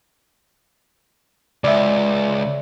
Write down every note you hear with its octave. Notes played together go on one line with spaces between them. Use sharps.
C#2 D5 E5